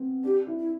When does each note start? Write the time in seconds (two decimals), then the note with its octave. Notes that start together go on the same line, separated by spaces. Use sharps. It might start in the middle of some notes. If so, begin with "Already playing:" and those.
Already playing: B3 C4
0.24 D4 G4
0.47 E4
0.59 E4